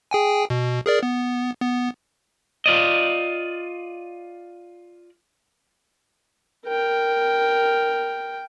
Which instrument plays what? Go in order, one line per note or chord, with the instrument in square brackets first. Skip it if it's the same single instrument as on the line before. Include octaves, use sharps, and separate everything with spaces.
[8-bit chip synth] G#4 G5 G#5
B2
G#4 A#4 D5
B3
B3
[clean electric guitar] F4 D5 D#5
[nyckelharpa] A#4 G5